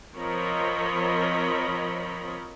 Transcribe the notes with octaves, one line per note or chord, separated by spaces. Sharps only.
F3 C4 A#4 C#5 D#5 B5